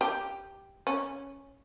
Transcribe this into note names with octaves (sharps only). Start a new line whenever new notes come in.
G4
C#4